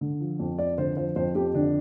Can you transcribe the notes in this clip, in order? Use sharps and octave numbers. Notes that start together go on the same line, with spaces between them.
D3
F3
F2
F2 D5
D3 C5
F3 C5
F2 C5
F2 G4
D3 D4